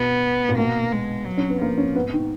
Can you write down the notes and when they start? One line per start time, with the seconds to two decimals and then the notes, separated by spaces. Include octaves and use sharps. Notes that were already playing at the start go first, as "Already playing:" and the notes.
Already playing: B2 B3
0.49 A#2
0.57 B2 A#3
0.92 G#3
1.26 F#3
1.37 C#4
1.50 B3
1.61 F3 A#3
1.78 C#4
1.96 G#2 B3
2.13 D#3